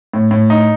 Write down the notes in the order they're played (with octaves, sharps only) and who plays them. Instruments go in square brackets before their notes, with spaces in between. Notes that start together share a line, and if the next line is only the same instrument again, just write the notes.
[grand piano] A2
A2
D#4